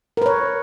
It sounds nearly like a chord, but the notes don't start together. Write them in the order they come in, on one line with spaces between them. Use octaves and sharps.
A#4 B4 C#5